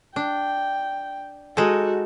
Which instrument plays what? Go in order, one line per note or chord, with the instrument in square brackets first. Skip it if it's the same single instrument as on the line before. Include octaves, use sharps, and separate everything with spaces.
[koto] D4 [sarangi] G5
[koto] G#3 D#4 A4 [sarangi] F#4